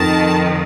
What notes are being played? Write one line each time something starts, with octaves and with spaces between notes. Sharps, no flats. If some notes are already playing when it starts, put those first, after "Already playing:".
Already playing: F2 D#3 A5